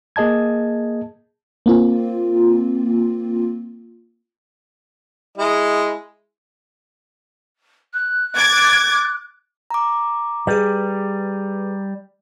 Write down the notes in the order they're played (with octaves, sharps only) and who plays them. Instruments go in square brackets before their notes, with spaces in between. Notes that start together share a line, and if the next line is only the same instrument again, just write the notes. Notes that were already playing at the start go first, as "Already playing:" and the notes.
[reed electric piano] A#3 G#4 D#5 A5 G#6
[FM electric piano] A#3 C4 F4
[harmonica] G#3 E4 D#5
[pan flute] F#6
[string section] D6 G#6 A6
[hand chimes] A#5 D6
[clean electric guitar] G3 [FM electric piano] G#4 B4